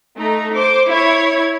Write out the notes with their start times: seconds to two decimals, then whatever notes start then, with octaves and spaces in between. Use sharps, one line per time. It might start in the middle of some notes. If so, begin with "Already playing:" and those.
0.19 A3 D#4 A#5
0.55 C5 D6
0.89 E4 C#5 G#6